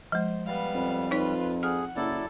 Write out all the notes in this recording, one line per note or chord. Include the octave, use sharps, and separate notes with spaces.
F3 G#3 C5
G3 B3 F5
F2
D#4 F4 B4 C#5
G#4 F#5 F6
F#1 F#3 E4 A4 D5